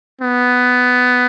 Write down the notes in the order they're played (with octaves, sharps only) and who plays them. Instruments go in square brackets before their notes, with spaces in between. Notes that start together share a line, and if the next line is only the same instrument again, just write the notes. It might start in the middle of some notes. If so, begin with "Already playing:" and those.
[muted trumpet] B3